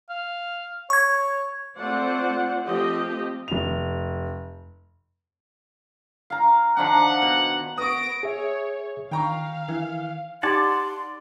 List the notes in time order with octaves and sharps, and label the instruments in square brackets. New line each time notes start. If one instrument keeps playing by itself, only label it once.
[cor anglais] F5
[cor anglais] C#5 [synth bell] C#6 G#6
[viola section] A3 C4 F4 C5 D5 F#5
F3 A3 C4 G4 D#5 G5
[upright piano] F1 F7
[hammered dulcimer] F5 A#5
[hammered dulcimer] D#3 F3 D4 [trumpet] F#5
[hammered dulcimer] B2
[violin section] B3 A#6 D7 [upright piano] C#6 D#6
[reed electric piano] G#4 E5 [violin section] C#5
[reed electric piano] D#3 [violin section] F5 [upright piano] G5 A#5 C#6
[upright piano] E3
[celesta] D#4 G4 [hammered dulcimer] D5 [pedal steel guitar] F#5 A5 [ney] C6